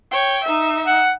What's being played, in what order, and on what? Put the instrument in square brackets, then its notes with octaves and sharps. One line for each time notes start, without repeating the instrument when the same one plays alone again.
[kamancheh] C#5 G5
D#4 E5
[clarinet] F#5